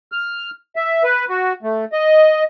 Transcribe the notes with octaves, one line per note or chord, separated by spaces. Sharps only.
F6
E5
B4
F#4
A3
D#5